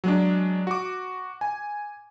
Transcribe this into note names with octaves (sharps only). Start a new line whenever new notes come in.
F#3 G#3 D4
F#4 D6
G#5